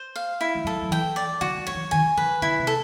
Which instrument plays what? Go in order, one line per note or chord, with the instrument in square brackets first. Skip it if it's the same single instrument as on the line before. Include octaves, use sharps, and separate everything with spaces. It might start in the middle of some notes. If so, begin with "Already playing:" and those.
Already playing: [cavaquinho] C5
F5
E4
[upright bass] G#3
[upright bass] G3 [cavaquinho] A4
[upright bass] F#3
F3
[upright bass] E3 [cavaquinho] G5
[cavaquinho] D5
[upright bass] D3 [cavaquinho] F#4
[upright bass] D#3
[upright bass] F3 [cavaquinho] C#5
[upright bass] E3
[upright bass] D#3 [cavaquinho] G#5
[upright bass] D#3 [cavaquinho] B4
[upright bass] D3 [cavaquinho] E4
[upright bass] C3
[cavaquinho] A4